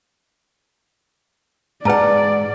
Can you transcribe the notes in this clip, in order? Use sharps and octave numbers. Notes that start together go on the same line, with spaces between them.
G#2 B4 D5 F#5 A5 A#5